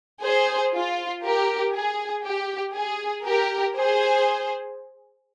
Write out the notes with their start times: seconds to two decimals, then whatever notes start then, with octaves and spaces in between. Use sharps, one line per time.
0.23 G#4 C5
0.74 F4
1.24 G4 A#4
1.75 G#4
2.25 G4
2.75 G#4
3.25 G4 A#4
3.76 G#4 C5